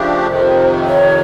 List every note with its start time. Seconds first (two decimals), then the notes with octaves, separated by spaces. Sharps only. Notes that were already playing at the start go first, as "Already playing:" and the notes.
Already playing: C#3 F3 A3 D4 G4
0.27 F2 C3 D#3 C5
0.86 C#5